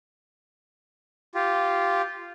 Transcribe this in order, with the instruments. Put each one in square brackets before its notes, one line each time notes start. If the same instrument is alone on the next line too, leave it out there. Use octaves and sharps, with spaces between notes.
[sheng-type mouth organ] F4 G4